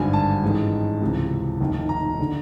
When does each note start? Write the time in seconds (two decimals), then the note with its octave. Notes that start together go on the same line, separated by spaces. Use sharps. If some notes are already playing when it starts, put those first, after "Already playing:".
Already playing: G#1 G2 D3 G#5
0.13 A5
0.43 A1 G#2 D#3
1.01 C#2 C3 E3
1.60 F1 D#2 D#3
1.89 A#5
2.20 D3